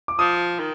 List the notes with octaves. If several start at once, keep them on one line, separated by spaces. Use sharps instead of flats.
D6
F3 D#6
D#3